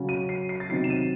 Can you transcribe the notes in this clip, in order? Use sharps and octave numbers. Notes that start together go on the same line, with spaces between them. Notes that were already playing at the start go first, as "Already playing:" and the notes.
Already playing: C#3 F#3
D#7
C7
C7
A6
C3 D#3 F#3 C7
E7
D#7